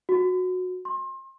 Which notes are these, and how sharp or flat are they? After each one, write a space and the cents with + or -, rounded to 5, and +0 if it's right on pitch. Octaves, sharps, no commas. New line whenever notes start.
F#4 -15
C6 +30